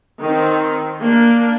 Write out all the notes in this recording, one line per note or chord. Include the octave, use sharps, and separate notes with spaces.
D#3 C4
A#3 D4